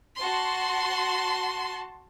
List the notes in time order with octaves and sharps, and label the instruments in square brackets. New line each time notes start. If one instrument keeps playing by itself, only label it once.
[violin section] F#4 A5 C6